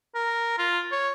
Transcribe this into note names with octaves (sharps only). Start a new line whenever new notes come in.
A#4
F4
C#5